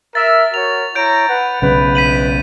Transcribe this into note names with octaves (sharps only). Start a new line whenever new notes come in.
A#4 E5 A6
F#4 A#4 C#5 F7
E4 C#5 A#5 G6 D7
B4 F#5
B1 C#3 B4
B6 D#7 F#7